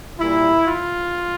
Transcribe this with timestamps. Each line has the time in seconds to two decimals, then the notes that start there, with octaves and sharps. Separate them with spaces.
0.19 A#2 G3 E4
0.67 F4